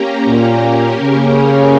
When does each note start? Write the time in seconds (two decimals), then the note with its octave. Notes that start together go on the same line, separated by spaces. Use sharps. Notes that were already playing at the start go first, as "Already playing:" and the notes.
Already playing: A#3 C#4 G4 A#4
0.28 A#2
1.01 C#3